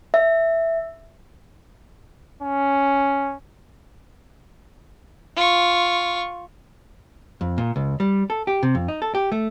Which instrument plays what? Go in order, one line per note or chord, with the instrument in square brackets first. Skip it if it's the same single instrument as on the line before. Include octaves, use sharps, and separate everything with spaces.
[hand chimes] E5
[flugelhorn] C#4
[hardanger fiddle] F4 C#6
[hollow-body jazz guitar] F2
A#2
C#2
G3
A4
G4
C3
F2
D#4
A4
G4
A3